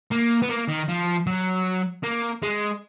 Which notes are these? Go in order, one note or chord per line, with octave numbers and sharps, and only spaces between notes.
A#3
B3
A#3
D#3
F3
F#3
A#3
G#3